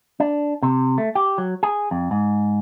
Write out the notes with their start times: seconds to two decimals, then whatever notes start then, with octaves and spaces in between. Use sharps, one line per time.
0.20 D4
0.63 C3
0.98 A3
1.15 G4
1.38 F#3
1.63 G#4
1.91 F2
2.11 G#2